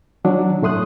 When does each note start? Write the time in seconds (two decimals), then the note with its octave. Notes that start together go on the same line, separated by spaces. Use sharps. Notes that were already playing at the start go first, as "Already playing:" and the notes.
0.24 D#3 F#3 D4
0.62 F#2 A2 A3 C6 D#6 F#6